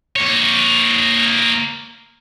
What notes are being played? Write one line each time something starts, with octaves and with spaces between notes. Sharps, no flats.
A#3 C#5